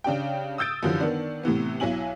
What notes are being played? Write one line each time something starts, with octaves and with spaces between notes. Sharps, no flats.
C#3 D4 G4 G5
D#6 E6 G6 A6 D7
F#2 D3 E3 F3 G3
D#3 B3 D4
A2 C3 E3 B3
B1 F#3 E4 G#5 F#7